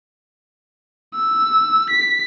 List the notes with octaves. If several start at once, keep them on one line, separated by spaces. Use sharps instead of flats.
E6
B6